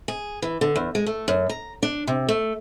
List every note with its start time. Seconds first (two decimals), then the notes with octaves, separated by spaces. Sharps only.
0.08 G#4
0.42 E3
0.61 D3
0.76 E2
0.95 G#3
1.06 A3
1.28 F#2
1.49 A#5
1.83 D4
2.07 C3
2.29 A3